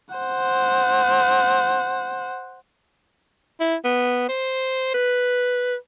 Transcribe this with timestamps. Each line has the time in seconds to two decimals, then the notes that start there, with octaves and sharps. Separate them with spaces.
0.15 C5 F#5
3.60 E4
3.85 B3
4.29 C5
4.94 B4